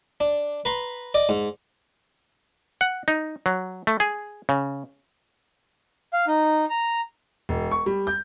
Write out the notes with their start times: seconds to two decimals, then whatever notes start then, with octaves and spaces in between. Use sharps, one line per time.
0.20 D4
0.65 B4 A#5 C6
1.14 D5 D#5
1.29 G#2
2.81 F#5
3.08 D#4
3.46 F#3
3.87 A3
4.00 G#4
4.49 C#3
6.13 F5
6.27 D#4
6.70 A#5
7.49 E1
7.71 C#6
7.86 G3
8.07 G6